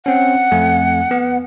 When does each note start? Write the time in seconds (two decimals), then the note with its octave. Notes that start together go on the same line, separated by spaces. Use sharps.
0.06 C4 C#4 F#5
0.51 F2 A3 G#5
1.11 B3